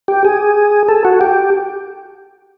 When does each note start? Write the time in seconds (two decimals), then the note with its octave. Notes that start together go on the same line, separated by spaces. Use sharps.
0.08 G4
0.25 G#4
0.88 A4
1.05 F#4
1.21 G4